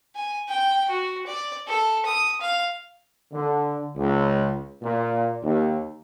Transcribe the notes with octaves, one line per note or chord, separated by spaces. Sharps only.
G#5
G5
F#4
D5
A4
D#6
F5
D3
C#2
A#2
D#2